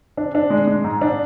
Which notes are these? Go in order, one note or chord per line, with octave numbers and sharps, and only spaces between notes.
D4
D4
G#3
G#3
G#2
D4